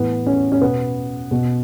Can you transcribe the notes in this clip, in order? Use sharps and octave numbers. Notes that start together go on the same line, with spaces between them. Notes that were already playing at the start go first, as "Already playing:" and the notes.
Already playing: A2 E3 B3
C#4
C#4
B2 B3
B2